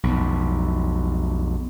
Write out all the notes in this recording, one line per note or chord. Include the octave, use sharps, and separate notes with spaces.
B1 F2